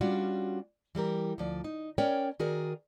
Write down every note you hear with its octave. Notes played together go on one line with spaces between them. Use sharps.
G3 C#4 D4 F4 F#4 D5
E3 G3 G4 A#4
D2 F3 D5
D#4
C#4 A#4 C#5 D5 G5
D#3 F#4 G#4 A#4 D5